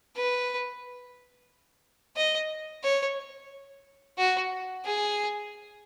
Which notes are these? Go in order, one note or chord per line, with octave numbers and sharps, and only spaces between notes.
B4
D#5
C#5
F#4
G#4